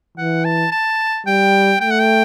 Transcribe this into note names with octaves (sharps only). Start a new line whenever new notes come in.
E3 F#5
A5
A5
G3 G5
A3 G5
F#5
G5